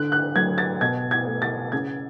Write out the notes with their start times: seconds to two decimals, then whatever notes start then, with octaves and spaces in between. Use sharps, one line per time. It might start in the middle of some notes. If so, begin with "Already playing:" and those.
Already playing: D3 F#6
0.12 F#6
0.36 F#3 A3 G#6
0.58 A6
0.81 B2 G#6
1.11 G#6
1.26 A3
1.42 A6
1.72 C#3 G#6